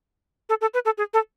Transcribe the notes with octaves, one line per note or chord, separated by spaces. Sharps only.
A4
A4
B4
A4
G#4
A4